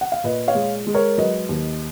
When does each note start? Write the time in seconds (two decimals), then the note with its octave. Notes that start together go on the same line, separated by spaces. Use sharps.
0.01 F#5
0.12 F5
0.24 A#2 B4 D#5
0.48 C#5 F5
0.55 G#3
0.87 G#3
0.94 A#4 C#5
1.18 F#3 B4 D#5
1.49 D#2